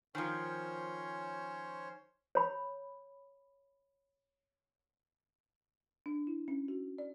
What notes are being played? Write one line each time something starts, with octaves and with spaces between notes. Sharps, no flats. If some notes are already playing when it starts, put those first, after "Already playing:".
D#3 F3 C#4 C5 C#5
C#5 B5
D4
E4
C#4
F#4
D5